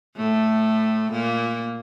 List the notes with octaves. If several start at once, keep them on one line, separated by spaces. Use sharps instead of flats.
A2 A3
A#2 A#3